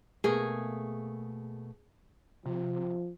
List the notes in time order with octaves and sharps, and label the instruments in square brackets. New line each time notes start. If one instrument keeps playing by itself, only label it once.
[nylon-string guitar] B2 A3 A#3 [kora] G#4
[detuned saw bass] C3 [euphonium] F3